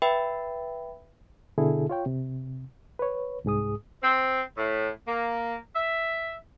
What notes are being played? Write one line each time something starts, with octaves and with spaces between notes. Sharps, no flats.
B4 E5 G5 B5
B2 D3 E4 G#4 A4
F4 C#5 G5
C3
B4 C#5
C2 G#2 G#4 D#6
C4
A2
A#3
E5